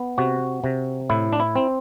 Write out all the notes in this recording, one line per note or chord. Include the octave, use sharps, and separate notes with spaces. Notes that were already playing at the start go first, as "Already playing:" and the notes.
Already playing: B3
C3 F#4
C3
A2 E4
D4
E4
C4